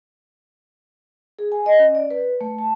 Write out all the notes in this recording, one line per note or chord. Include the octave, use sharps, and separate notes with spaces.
G#4
G#5
D#5
C#4
D5
B4
A3
A5